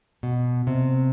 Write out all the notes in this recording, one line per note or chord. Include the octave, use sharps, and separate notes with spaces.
B2
C3